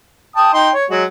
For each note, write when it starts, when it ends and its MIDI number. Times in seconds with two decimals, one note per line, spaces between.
0.36 0.52 79
0.36 0.52 81
0.36 0.52 87
0.54 0.69 63
0.54 0.69 79
0.54 0.69 84
0.74 0.85 73
0.90 1.04 54
0.90 1.04 56
0.90 1.04 66